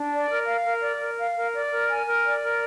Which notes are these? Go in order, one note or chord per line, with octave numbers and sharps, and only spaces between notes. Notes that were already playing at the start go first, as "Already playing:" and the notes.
Already playing: D4
D5
A#4
F5
A#4
D5
A#4
F5
A#4
D5
A#4
G#5
A#4
D5
A#4